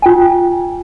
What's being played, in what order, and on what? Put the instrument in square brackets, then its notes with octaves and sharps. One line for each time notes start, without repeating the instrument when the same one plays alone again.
[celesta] F4 G5 G#5